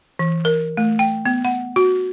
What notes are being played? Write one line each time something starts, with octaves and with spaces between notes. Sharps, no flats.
E3
A#4
A3
G5
B3
F#5
F#4